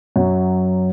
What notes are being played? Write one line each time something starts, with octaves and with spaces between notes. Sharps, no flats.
F#2 F#3